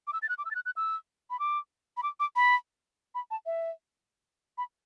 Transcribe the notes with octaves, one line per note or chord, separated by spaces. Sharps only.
D6
E6
A6
F#6
D6
E6
A6
F#6
F#6
E6
B5
D6
B5
D6
D6
B5
B5
A5
E5
B5